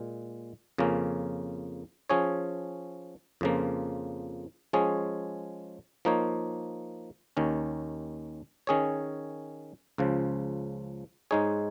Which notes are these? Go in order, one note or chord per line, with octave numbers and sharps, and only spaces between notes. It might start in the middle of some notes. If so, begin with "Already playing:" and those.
Already playing: A#2 G#3
F2 C#3 A#3 C#4
F3 C#4 G#4 C#5
F2 C#3 F3 A#3
F3 G#3 C#4 G#4 C#5
F3 A#3 D#4 C#5
D#2 D#3 C#4
D#3 C#4 G#4 C#5
C#2 C#3 F3
G#2 G#3 D#4 G#4 C#5